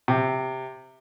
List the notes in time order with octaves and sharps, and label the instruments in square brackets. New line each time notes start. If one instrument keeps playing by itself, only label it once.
[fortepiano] C3